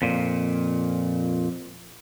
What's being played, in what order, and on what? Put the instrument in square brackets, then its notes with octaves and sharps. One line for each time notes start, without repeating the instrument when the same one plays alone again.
[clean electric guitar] F2 A#2